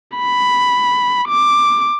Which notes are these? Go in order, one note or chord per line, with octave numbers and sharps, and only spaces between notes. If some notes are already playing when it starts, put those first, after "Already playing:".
B5
D6